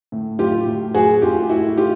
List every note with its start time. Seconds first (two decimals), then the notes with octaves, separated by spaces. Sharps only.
0.12 A2
0.39 F#3 F4 G4
0.67 A2
0.95 F#3 F#4 G#4
1.22 A2 F4 G4
1.49 A3 E4 F#4
1.77 F4 G4